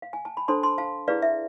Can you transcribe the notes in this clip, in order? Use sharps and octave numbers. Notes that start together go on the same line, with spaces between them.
F5
G#5
A5
B5
D4 A4 C5 A5 C6
A5 C6
F5 A5
E4 G#4 B4 D5 F5
E5